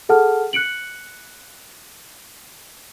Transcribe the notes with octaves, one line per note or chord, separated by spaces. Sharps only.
G#4 A4 F#5 A5 F6
F#6 C#7 D7 F#7